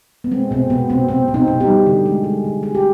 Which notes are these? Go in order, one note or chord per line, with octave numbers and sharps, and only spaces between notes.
B3
G#3 C4
B2 C4
B2 B3
B2 C4
B2 C4
B2
C4 D#4
B2
D#4 G4
G3
D3
G#3
G#3
D3
G#3 G#4
G4